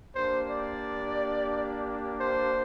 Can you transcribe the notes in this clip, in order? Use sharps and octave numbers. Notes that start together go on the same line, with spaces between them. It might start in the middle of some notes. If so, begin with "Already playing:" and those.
A#3 D4 G4 C5
D5
C5